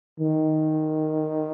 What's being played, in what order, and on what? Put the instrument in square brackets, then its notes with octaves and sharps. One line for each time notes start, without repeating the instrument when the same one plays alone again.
[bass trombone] D#3